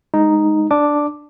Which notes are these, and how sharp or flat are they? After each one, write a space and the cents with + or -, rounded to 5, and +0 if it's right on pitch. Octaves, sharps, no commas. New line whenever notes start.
G#3 +0 D#4 +0
D4 +0 D6 +0